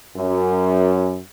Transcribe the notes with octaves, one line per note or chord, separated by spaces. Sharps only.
F#2